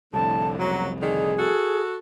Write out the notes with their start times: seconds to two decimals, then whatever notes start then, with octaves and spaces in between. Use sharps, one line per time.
0.13 C2 F2 A2 D3 A5
0.59 A#2 C#3 F#3 A#5
1.01 D3 D#3 G#4
1.39 F#4 A4